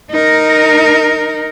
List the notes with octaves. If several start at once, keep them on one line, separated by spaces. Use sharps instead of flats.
D#4 A#4